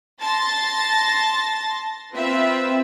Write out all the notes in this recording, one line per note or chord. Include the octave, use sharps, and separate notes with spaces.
A5 C6 A6 A#6
C4 F4 B4 E5